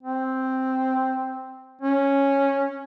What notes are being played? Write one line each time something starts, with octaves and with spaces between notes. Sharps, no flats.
C4
C#4